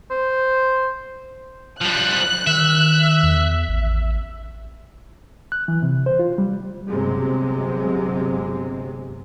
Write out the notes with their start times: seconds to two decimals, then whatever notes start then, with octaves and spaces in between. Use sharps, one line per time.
0.11 C5
1.81 F3 G3 F#6
2.47 D#3 E5
3.23 E2
3.69 A1
5.52 F#6
5.68 E3
5.82 C3
6.06 C5
6.19 F4
6.38 G3
6.89 G1 C3 F#3 G#3 C4